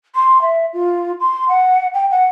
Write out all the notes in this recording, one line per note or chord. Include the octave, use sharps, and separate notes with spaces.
C6
E5
F4
C6
F#5
G5
F#5